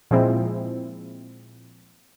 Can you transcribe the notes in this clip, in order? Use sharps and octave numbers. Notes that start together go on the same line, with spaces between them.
A#2 F3 G#3 C4 E4